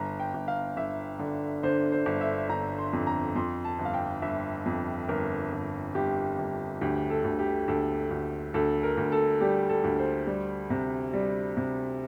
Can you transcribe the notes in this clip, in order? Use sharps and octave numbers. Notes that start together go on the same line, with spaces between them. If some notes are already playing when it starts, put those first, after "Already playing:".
Already playing: G1 A#5
G5
G1
F5
G1 E5
D3
D3 C5
C5
G1
E5
G1 A#5
C6
F2
A#5
F2 C6
A5
G1
F5
G5
G1 E5
F2
G1 A#4
G1
G1 G4
G1
D2 G4
A4
D2
G4
D2 A4
D2
D2 A4
A#4
D2
A4
G3 G4
A4
D2
C5
G3
C3
G3
C3